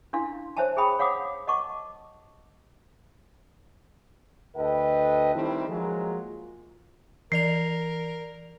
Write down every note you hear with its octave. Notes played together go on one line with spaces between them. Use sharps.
D4 E4 F5 C6
C5 C#5 E5 G#5 A5
G#4 E5 G5 B5 D#6
C#5 F5 F#5 D6 D#6
D#5 F#5 A5 C#6 D6
D2 A4 B4 D#5 G5
D#3 G3 A3 C4 D#4 E4
F3 F#3 G#3 A#3 F4 G#4
E3 A#4 D5 C7 F7